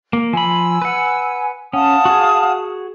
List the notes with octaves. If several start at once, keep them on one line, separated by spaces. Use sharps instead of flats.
A#3
F3 G#5 B5 E6
B4 F#5
C#4 F5 F#5 A5 D#6
F#4 G#4